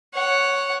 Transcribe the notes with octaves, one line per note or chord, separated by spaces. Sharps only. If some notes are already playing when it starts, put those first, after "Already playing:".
C#5 F#5